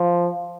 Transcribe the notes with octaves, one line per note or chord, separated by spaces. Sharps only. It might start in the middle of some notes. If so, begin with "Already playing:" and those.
Already playing: F3